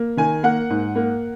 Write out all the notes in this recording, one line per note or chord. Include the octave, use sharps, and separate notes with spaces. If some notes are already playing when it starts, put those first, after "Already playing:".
Already playing: A#3
D#3 G#5
A#3 F#5
G#2
A#3